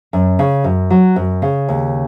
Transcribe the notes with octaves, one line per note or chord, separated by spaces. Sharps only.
F#2
C#3
F#2
F#3
F#2
C#3
D#2